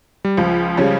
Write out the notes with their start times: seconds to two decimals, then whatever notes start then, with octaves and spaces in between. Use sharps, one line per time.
0.25 G3
0.37 C#2 F3
0.77 C#3 G3 C#4